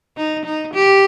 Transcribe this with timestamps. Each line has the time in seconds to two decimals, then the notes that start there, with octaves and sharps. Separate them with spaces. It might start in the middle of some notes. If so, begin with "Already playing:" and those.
0.17 D#4
0.45 D#4
0.73 G4